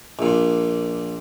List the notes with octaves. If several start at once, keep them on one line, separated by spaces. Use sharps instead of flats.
A#1 A#2